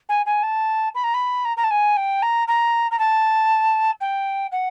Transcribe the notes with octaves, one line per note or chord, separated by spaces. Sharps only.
G#5
G#5
A5
B5
A#5
B5
A#5
A#5
A5
G#5
G5
A#5
A#5
A#5
A5
G5
F#5